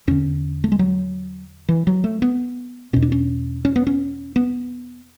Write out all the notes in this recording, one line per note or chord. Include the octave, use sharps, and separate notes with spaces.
E2 D3 C#4
A3
G#3
F#3
E3
F#3
A3
B3
E2 B2 C#4
D4
C#4
C#4
B3
C#4
B3